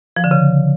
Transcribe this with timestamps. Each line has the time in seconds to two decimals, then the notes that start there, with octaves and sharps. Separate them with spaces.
0.17 F3
0.24 D3
0.31 C#3